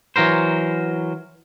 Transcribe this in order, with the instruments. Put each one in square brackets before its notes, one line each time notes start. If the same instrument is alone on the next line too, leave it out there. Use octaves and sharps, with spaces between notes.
[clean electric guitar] E3 F#3 A#4 C5